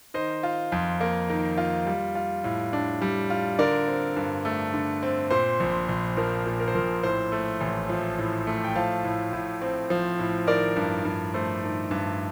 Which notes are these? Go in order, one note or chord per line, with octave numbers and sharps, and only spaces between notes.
D#3 C5 D#5
F4
F2
A#3
D#3
F4
G3
F4
A2
D4
G3
F4
D3 A#4 D5
C4
G2
A3
D3
C4
A#2 C5
A#1
A#1
F3 A#4
A#2
A#4
C5
A#1 A#4
A2 C5
A3
A1
F3
A2
A3
G5
F3 F5 A5
A2
A2
C4
F3
A2
D#3 A#4 D5
G2
G2
A3 C5
D#3
G2